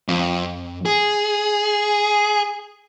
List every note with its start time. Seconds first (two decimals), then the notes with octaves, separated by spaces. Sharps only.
0.08 F2
0.86 G#4